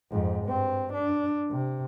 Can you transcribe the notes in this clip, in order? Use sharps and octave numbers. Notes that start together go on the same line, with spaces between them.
F2 G#2
G2 C4
D4
C3